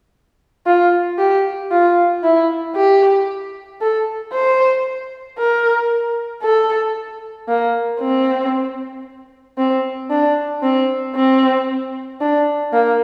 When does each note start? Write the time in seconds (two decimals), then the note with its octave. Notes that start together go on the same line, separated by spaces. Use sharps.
0.66 F4
1.19 G4
1.71 F4
2.24 E4
2.76 G4
3.81 A4
4.33 C5
5.38 A#4
6.43 A4
7.48 A#3
8.00 C4
9.58 C4
10.11 D4
10.63 C4
11.16 C4
12.21 D4
12.73 A#3